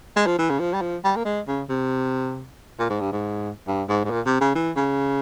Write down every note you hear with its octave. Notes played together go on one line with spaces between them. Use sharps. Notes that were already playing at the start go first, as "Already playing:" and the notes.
G#3
F3
E3
C#3
F3
G3
F3
G3
A#3
G#3
C#3
C3
A#2
G#2
G2
G#2
G2
G#2
G#2
A#2
C3
C#3
E3
C#3